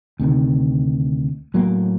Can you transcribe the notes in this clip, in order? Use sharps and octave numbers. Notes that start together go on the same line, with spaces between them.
D2 C3 D#3
A2 F#3 A#3